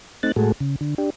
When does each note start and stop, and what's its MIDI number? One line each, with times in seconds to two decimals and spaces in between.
0.23 0.32 57
0.23 0.32 60
0.23 0.32 63
0.23 0.32 90
0.23 0.32 93
0.36 0.52 45
0.36 0.52 56
0.36 0.52 57
0.36 0.52 66
0.36 0.52 68
0.36 0.52 69
0.60 0.76 49
0.81 0.95 50
0.98 1.10 62
0.98 1.10 67